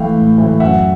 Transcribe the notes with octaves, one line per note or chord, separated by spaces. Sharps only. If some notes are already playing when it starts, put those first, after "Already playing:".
Already playing: E3 A3 F5 G5
A2
E3 A3
F#2 E5 F#5